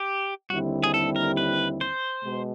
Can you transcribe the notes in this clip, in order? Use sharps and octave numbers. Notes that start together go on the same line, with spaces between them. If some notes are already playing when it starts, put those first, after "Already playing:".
Already playing: G4
D#2 D3 G3 C4 E4 F#4
G#4
A4
A#4
B4
C5
B2 G#3